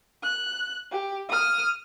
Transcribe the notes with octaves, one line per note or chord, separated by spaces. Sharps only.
F#6
G4
D#6 F6